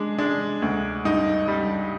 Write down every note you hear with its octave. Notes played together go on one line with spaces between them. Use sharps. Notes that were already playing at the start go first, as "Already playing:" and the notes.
Already playing: G#3 D4
G#3 D4
D2
G2 D#4
G3